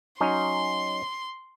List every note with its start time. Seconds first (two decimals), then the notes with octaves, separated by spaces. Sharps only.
0.21 F#3 C#4 D#4 C6